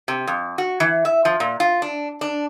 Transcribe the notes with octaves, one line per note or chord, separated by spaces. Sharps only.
C3
F2
F#4
E3
E5
F3
A#2
F4
D4
D4